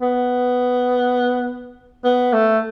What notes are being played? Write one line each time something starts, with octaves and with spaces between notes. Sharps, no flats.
B3
B3
A3